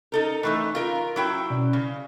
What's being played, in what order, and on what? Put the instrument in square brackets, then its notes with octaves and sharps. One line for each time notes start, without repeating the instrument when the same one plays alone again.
[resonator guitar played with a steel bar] D#4 A4 A#4
E3 A3 D#4
F4 A#4
F#3 E4 G5
[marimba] B2 C#4 D5
[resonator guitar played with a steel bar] C#3